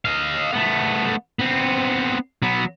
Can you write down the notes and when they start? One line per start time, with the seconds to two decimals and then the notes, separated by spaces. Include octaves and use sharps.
0.05 D#5 F5
0.53 A3 B3
1.39 B3 C4
2.43 F#3 B3